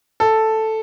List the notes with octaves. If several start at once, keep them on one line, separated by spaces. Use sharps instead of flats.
A4